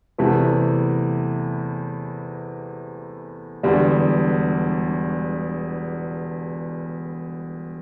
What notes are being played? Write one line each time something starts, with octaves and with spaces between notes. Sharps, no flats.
E2 C3 E3 A3 E4
E1 E2 D3 G3